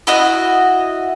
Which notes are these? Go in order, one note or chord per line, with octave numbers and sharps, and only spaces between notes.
E4 F#4 D#5